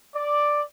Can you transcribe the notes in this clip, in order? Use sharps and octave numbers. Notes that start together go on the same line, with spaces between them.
D5